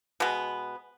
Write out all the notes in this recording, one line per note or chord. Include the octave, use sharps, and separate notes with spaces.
B2 G#3 B3